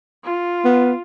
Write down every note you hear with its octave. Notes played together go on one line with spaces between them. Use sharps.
F4
B3